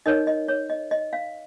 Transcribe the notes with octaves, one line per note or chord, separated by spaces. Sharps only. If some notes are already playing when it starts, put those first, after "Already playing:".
D#4 A#4 C#5 D#5
D#5
C#5
D#5
D#5
F5